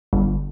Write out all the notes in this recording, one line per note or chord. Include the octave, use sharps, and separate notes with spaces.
G1